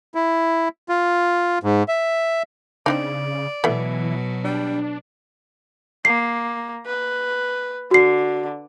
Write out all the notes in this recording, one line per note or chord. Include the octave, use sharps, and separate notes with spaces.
E4
F4
G#2
E5
C#3 C4 D4 D#4 D5
B2 E3 F#3 A3 B3
G3 D4
A#3 C7
B4
D3 F#4 C7